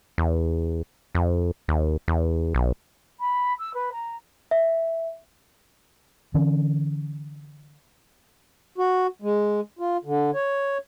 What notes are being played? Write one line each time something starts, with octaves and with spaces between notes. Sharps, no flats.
E2
F2
D#2
E2
B1
B5
E6
B4
A#5
E5
D3 E3 C#4
F#4
G#3
F4
D3
C#5